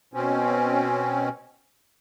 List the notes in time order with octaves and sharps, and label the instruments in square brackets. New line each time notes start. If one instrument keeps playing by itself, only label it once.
[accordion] B2 C4 C#4